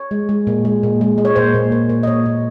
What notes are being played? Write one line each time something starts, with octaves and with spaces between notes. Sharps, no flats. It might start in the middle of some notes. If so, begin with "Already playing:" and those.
Already playing: C#5
G#3
G#3
A#2
G#3
A#2
G#3
G#3
C#5
A#2 C5
A#2
A#2
A#2
D#5
A#2 C#5
A#2